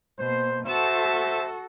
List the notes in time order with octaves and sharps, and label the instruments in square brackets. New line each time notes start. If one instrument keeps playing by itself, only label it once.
[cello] B2 A#3 [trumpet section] C5
[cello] F#4 A4 [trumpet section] C5 E5 [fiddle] A5 E6